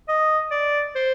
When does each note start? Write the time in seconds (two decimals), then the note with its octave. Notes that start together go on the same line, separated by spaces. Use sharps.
0.08 D#5
0.51 D5
0.95 C5